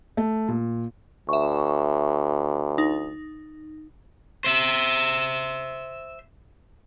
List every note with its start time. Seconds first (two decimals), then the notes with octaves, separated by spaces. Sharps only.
0.17 A3
0.48 A#2
1.29 D2 E5 C#6
2.78 D#4
4.44 C5 E5